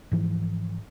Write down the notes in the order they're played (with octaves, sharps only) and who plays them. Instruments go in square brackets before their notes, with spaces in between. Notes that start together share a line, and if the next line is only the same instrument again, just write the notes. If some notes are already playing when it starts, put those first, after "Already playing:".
[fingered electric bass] G#2 E3 F3